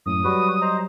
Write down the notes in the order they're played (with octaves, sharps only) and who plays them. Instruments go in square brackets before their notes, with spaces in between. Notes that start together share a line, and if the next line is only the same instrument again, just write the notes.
[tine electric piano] F#2 A2 [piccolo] D#6
[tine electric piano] F#3 G3 [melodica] F#4 B4
[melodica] C5 D#5 A#5